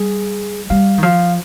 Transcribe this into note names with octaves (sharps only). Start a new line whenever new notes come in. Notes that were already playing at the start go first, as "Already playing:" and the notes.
Already playing: G3 G#4
G3 F5
D#3
F3 F5